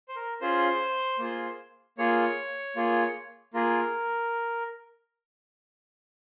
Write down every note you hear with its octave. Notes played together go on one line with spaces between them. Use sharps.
C5
A#4
C#4 F4 G#4 C5
A#3 F4 G#4
A#3 F4 G#4 C#5
A#3 F4 G#4
A#3 F4 G#4 A#4